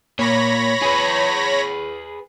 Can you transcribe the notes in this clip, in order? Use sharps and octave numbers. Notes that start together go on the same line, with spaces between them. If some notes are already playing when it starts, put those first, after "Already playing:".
A#2 C#5 B5 A#6
G#4 B4